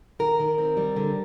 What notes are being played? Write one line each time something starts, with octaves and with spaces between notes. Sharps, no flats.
D#3 A#4
D#3
C4
G3
D3